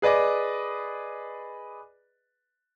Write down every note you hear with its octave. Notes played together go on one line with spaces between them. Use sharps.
G#4 B4 D5 D#5 D6